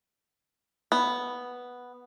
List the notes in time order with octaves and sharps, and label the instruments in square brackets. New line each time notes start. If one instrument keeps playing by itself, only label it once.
[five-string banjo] B3